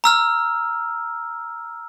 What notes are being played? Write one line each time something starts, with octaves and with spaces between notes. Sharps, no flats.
A#5 E6 F6